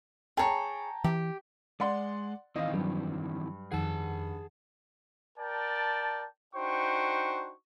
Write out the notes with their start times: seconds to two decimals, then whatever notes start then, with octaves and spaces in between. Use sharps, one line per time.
0.37 G#4 C#5 G5 A5 A#5
1.04 E3 G4
1.80 G#3 D5 F#5 C6
2.56 D#3 E3 C4 D#5 F5
2.74 G2 F#3
3.72 F2 D#3 G#4 F#5 A5
5.38 A#4 D5 G5 A5
6.55 D4 D#4 F#4 C5 G5 C#6